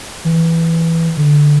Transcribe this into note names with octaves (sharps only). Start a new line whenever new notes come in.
E3
D3